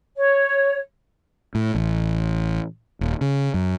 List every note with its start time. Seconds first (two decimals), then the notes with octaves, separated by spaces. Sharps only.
0.16 C#5
1.55 A2
1.75 A1
3.01 D#1
3.21 C#3
3.54 F#2